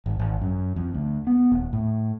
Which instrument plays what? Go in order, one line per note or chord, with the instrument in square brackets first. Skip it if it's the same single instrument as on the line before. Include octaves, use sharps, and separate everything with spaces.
[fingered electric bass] G#1
G#1
F#2
F2
D2
B3
D#1
A2